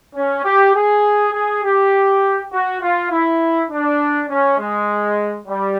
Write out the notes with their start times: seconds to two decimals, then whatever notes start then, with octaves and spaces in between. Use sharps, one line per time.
0.15 C#4
0.44 G4
0.74 G#4
1.33 G#4
1.63 G4
2.51 F#4
2.81 F4
3.10 E4
3.70 D4
4.29 C#4
4.58 G#3
5.47 G3